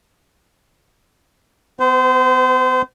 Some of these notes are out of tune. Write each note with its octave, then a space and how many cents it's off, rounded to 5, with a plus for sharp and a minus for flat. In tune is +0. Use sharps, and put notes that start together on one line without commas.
B3 +40 C5 -30